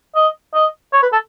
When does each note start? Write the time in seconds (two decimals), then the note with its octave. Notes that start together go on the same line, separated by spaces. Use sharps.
0.16 D#5
0.55 D#5
0.93 C#5
1.03 B4
1.13 A4